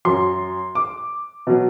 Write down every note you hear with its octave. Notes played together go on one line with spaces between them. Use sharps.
F#2 F#3 C6
D6
B2 F#3